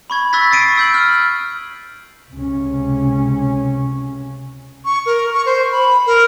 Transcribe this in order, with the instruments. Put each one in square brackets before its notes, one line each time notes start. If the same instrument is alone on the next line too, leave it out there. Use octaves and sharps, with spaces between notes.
[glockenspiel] B5 C#6 G#6
C#6 E6 F#6 A6 B6
D#6 A6 C7 D7 D#7
E6 G6 F#7
F6
[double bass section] C#2 C3 C#4
[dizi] C#6
A#4
C#6
C5
B5
A#4